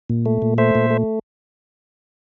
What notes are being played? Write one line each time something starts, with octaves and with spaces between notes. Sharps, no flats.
A#2
A3
A#2
A3 C5 E5
A#2
A3